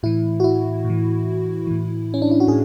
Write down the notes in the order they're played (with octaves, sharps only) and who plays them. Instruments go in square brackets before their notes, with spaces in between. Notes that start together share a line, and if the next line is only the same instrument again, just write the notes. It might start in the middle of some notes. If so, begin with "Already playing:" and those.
[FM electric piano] A2 E3 E4
F#4
E4
A2
E3
A2 E3
C#4
D4
E4
F#4
A2 G#4